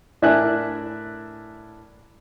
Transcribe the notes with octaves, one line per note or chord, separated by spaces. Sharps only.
A2 D4 A#4 E5 G#5 F#6